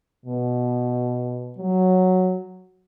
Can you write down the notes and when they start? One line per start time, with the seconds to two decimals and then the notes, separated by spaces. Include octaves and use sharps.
0.26 B2
1.57 F#3